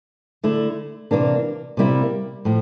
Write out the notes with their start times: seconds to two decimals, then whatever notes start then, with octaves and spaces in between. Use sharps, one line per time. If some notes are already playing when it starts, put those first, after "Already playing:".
0.44 D3 A3 E4
1.11 C3 E3 A#3 D4
1.77 C3 G3 A#3 E4
2.45 A2 F3